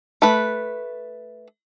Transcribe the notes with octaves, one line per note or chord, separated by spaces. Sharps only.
A3 B4